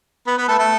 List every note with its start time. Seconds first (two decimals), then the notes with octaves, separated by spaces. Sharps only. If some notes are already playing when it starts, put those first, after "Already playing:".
0.27 B3 B4
0.38 B3 B4
0.48 A3 A4
0.59 A3 A4